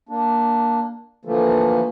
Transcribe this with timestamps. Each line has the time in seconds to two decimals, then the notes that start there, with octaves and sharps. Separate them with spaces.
0.09 A#3 D4
1.25 D3 E3 F3 A3 A#3